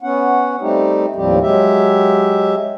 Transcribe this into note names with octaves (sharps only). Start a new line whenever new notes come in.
B3 C#4 F#5
G3 A3 C4 D#4 G4
D#2 A2 F3 G3 C4 G4
F#3 G#3 G4 E5